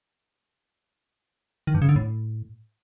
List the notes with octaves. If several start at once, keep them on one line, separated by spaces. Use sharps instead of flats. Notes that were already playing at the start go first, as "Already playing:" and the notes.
D#3
G2
C#3
D3
A2